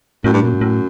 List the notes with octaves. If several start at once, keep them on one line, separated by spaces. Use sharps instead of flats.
F#2 A2
G2
F#2 A#2
G#2
A2